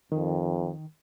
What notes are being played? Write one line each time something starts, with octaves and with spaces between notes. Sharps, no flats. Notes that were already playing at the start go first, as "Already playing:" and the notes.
F2 D#3